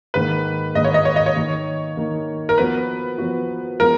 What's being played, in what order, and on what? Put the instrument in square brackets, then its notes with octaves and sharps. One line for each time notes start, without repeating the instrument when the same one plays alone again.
[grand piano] G#2 D#3 A#3 [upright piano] B4
[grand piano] G#2 D#3 A#3 [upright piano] D#5
[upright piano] C#5
D#5
C#5
D#5
C#5
[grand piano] D#3 A#3 D#4
D#3 A#3 D#4
[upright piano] A#4
[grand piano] F3 B3 F#4 [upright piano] B4
[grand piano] F3 B3 F#4
[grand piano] F3 G#3 B3 F4 [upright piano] A#4